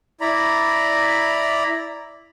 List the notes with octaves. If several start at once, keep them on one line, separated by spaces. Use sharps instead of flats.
E4 D5 A#5 B5